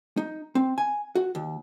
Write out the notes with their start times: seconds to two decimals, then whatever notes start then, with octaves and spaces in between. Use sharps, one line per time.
0.17 D#4
0.55 C4
0.78 G#5
1.15 F#4
1.35 D#2